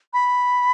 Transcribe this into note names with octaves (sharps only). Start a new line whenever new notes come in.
B5